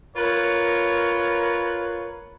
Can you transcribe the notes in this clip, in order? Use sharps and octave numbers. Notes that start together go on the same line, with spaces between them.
F4 A#4 B4 C#5